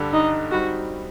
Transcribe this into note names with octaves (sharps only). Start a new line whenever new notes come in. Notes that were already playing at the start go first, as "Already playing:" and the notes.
Already playing: G2 D3 G3 D4 A4
D#4
G3 C4 D#4 F#4